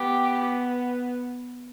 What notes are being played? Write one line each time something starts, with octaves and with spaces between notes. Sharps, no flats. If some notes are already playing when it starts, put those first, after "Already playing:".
Already playing: B3 G4